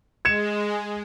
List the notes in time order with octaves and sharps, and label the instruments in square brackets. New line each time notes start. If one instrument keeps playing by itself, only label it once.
[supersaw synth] G#3 [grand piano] G#6 C#7 E7